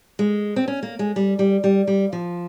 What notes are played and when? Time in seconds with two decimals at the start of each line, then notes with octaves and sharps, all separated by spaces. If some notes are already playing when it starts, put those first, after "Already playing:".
0.19 G#3
0.56 C4
0.68 C#4
0.83 A#3
0.99 G#3
1.16 G3
1.39 G3
1.64 G3
1.87 G3
2.13 F3